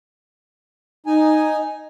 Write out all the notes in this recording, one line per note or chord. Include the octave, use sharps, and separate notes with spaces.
D#4 G#5